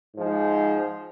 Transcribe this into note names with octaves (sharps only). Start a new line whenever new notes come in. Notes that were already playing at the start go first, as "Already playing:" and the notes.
G#2 F3 G#3